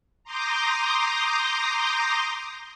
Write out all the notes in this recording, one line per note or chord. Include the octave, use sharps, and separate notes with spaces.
A#5 C6 D6 D#6 G6 A#6